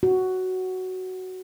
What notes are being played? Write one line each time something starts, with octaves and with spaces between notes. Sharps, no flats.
F#4